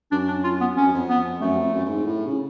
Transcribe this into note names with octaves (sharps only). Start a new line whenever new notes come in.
F#2 D4
D4
F4
B3
F2 C#4
F#2
F2
B3
F#2 A3
F2
F#2
F#2
G#2
A2
C#3